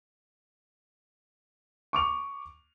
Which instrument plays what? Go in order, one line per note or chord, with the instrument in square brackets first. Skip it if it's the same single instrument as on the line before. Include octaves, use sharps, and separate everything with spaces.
[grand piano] C#6 D6 F7